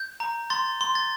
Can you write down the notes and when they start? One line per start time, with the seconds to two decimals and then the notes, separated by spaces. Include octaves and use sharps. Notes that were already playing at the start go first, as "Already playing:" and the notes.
Already playing: G6
0.20 A#5
0.50 C6 A6
0.81 C6
0.95 A6